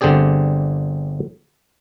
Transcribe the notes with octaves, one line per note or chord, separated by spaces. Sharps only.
G1 D3 C4 G4 G#4 D5